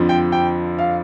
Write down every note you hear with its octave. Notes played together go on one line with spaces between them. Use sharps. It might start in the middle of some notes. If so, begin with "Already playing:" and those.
Already playing: F2 D3 F3
G5
G5
F5